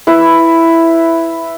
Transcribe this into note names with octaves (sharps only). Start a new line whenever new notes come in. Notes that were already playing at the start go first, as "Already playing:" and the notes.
E4 B4 E5